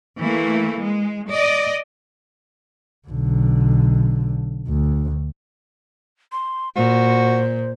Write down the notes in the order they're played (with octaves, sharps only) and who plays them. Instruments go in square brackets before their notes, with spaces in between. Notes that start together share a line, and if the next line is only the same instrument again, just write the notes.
[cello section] E3 A3 A#3
G#3
D5 D#5
[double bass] B1 D3
D2
[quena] C6
[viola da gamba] A#2 [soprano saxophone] F#4 [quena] C5